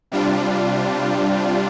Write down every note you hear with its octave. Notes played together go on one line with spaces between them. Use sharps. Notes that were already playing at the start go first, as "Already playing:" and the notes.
C3 G3 D4 F4